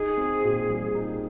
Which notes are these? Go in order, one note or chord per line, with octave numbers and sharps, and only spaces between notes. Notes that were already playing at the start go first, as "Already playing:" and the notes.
Already playing: D#4 G#4
C4
A#2
G3
D#4